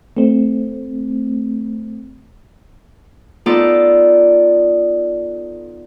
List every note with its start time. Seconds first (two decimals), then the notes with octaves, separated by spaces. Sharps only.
0.17 A3 C4
3.46 B3 D#4 F4 A4 D5